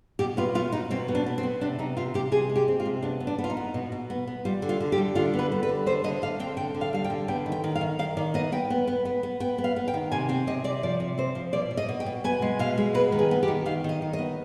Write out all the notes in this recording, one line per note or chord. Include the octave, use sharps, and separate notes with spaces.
B2 G4
B3 F4
B3 F4
B2 D#4
B2 C4
B3
D4
B3
C4
B3
C3 D4
C3 D#4
C3 F4
C3 G4
C3 G#4
G#3
G4
C4
F4
C3
B3 D4
B3
D4
B3
F4
D#4
B3
B2
B2
B3
B3
G3 F4
D3
F4
D3
G4
G3
D3 F4
B3
B4
G3
B4
D3
D3 C5
D3 D#5
D3 F5
C4 G5
D3 G5
D3
F5
G3 F5
G5
D3
B3 G5
D#3
G5
D#3
F5
D#3
D#3 F5
D#3 D5
B3 D#5
B3 G5
B3
B3
B3
B3
B3 G5
B3
F5
B3
G5
D#3
C3 G#5
C4 G5
C3 D#5
C3 D5
F3 D5
C3
C4 C5
F3
B2 D5
B2
D#5
B2
G5
B2
B3 G#5
G#3
B2 F5
G#3
B3 B4
D#3
G#4
B3
G4
D#3
D#3 F5
D#3 D#5
D#3
D#5
B3